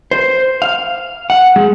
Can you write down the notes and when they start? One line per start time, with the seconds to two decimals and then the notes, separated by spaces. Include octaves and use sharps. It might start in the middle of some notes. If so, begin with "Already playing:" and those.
0.11 C5
0.62 F5
1.30 F#5
1.56 G#3